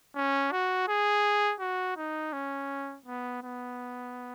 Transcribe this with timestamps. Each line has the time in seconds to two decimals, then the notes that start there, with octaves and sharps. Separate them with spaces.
0.16 C#4
0.52 F#4
0.88 G#4
1.60 F#4
1.97 D#4
2.33 C#4
3.06 B3
3.43 B3